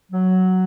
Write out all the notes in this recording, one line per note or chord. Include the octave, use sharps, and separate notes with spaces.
F#3